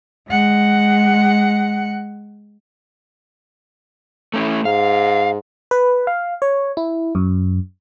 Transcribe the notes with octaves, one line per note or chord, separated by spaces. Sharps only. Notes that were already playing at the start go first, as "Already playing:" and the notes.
G#3 F#5
A3 C#4 E4
G#2 F5
B4
F5
C#5
E4
F#2